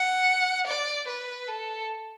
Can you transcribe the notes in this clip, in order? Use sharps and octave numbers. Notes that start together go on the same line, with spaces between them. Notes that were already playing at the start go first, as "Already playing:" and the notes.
Already playing: F#5
D5
B4
A4